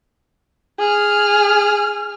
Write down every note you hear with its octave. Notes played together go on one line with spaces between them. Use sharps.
G#4 F6